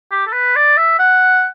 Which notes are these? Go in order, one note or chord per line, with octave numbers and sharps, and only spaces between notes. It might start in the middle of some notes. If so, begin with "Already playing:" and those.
G4
A4
B4
D5
E5
F#5